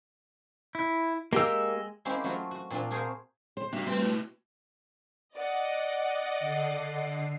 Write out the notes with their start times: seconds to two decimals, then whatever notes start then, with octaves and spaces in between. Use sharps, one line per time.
0.75 E4
1.33 G#3 A#3 G4 E6
2.05 G#3 A#3 C4 C#4 E4 G4
2.24 F#3 A3 C4 F4 F#4
2.51 F#4
2.71 A#2 C4 D4 F4
2.91 F4 F#4 G#4 A#4 C5 F5
3.57 C5
3.73 G2 A#3 F#4 G4 E5
3.86 G3 A3 C4 B4 A5 C6
3.98 B2 A3 E4 F#4
5.35 D5 D#5 F#5
6.40 D3 C7